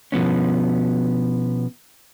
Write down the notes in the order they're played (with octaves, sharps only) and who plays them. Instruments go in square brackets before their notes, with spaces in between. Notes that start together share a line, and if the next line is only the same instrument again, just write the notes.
[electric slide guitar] B2 F3 B3 C#4